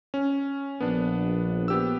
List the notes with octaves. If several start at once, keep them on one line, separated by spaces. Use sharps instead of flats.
C#4
A#1 B3 D4
B3 G4 E6